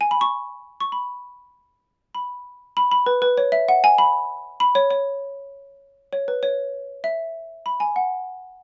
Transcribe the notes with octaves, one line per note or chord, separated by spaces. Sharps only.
G#5
B5
C#6
C#6
B5
B5
B5
B5
B4
B4
C#5
E5
F#5
G#5
B5
B5
C#5
C#5
C#5
B4
C#5
E5
B5
G#5
F#5